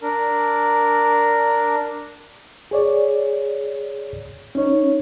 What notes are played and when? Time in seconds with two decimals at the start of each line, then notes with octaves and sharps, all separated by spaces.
0.02 D4 A#4
2.71 G#4 C#5 D5
4.55 C#4 D#4 C#5